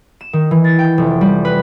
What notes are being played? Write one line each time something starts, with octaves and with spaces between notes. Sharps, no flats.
E7
D#3
E3
A6
G5
F1
G3
B4